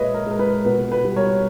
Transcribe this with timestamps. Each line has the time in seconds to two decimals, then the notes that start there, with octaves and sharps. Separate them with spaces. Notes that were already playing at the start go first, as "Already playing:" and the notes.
Already playing: A#2 G#3 B4 C#5 D#5 E5
0.14 A#4
0.27 G#3 A#4
0.39 B4
0.65 B2 B4
0.92 B4
1.05 G3
1.16 A#4 C#5